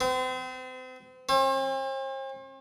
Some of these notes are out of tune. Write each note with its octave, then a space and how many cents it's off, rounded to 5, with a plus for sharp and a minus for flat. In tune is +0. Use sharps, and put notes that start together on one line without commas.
C4 -35
C4 +45